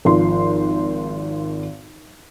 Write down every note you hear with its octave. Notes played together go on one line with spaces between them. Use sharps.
G#1 F3 C6